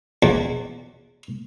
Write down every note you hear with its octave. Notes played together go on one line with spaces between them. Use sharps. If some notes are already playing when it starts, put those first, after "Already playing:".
E2